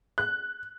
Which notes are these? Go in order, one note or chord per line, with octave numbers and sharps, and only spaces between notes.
F#6